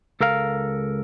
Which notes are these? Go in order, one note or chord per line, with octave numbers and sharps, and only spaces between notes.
C#2 A4 A#4 F5